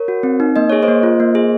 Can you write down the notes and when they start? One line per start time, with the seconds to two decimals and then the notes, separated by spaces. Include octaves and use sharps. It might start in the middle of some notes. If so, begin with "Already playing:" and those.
Already playing: A#4 C#5
0.08 F#4
0.23 C4
0.40 D#4
0.56 A#3 D#5
0.70 G#4 C#5
0.82 C5 D#5
0.88 A#3
1.03 F4
1.20 A#3
1.35 G#4